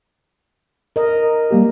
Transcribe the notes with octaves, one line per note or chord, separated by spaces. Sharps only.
A#4 D#5
G3 A#3 G4